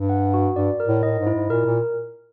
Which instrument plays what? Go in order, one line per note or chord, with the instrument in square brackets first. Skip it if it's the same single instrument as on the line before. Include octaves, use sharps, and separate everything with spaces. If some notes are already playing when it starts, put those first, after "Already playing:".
Already playing: [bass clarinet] G2
[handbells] F#5
F#4
[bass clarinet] G2 [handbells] D5
[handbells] A#4
[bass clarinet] A2
[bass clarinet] A2 [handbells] D#5
[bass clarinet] G#2
[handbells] E4
[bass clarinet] G#2
[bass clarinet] A#2 [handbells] A#4
[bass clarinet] A#2